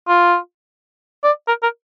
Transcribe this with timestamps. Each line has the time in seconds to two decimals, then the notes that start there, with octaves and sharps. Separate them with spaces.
0.08 F4
1.24 D5
1.48 A#4
1.63 A#4